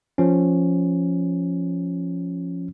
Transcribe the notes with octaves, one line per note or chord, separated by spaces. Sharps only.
F3 C#4